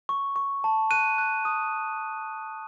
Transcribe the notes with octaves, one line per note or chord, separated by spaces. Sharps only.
C#6
C#6
A5
F#6 D#7
F#6
D#6